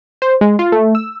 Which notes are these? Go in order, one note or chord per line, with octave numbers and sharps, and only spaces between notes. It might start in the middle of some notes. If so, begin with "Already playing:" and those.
C5
G#3
F4
A3
E6